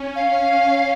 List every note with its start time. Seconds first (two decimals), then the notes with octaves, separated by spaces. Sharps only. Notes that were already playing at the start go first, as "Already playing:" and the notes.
Already playing: C#4
0.16 F5